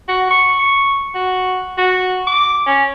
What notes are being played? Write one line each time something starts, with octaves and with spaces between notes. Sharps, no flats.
F#4
C#6
C#6
F#4
F#4
D6
C#4